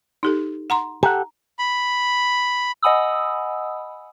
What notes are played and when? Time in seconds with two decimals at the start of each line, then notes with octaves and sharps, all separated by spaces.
0.23 D#4 G4 A4
0.70 F#5 A#5 C6
1.03 G4 A4 F#5 A#5
1.59 B5
2.83 D#5 F#5 G#5 B5 D#6 E6